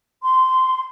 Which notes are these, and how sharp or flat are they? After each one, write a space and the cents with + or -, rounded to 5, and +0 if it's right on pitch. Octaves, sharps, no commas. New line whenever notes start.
C6 -15